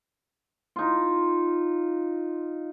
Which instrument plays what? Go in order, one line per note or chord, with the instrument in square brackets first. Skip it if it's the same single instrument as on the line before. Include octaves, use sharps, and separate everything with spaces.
[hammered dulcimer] D#4 F4